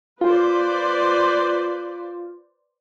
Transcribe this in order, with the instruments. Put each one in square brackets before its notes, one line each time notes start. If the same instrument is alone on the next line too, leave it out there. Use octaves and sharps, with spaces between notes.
[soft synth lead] F4 [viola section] B4 C5 D5